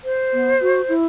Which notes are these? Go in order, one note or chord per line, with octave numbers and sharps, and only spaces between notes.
C5
B3
F#4
E4